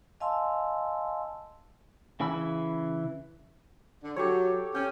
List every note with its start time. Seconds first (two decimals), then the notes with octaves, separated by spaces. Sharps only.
0.20 D#5 F5 G#5 A5 C6 E6
2.20 C#3 E3 G#5 B5 E6
4.02 D3
4.16 F#3 G4 A4 C#5
4.75 C#4 G5